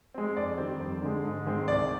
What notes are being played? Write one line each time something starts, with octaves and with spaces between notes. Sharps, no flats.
G#3 C4
F2 D5
D#3 G3 C4
F2
D3 G#3
G#2
D#3 G#3 C4
C2 D5